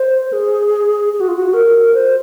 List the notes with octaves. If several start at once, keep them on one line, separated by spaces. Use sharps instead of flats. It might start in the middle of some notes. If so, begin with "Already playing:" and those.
Already playing: C5
G#4
G#4
F#4
F4
F#4
A#4
C5